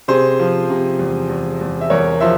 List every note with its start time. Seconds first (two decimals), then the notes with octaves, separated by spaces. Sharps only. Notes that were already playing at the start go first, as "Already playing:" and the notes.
0.08 C3 G#4 C5
0.39 F3
0.70 C3
0.99 E2
1.29 E2
1.61 E2
1.81 E5
1.90 E2 A#4 C#5
2.20 F3 C5 E5